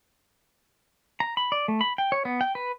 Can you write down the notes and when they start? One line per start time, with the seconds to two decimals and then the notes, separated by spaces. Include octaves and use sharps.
1.20 A#5
1.37 B5
1.52 D5
1.68 A3
1.81 B5
1.98 G5
2.12 C#5
2.25 B3
2.41 G5
2.55 B4